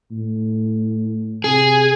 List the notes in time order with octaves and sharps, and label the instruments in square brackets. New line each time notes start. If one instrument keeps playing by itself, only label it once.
[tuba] A2
[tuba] C3 [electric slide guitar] G#4